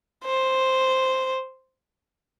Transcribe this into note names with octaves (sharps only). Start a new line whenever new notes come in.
C5